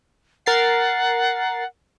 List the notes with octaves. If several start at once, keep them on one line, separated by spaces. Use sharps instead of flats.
A#4 F#5 A6 C7